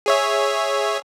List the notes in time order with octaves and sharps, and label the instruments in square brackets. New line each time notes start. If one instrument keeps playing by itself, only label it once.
[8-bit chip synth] G#4 C#5 E5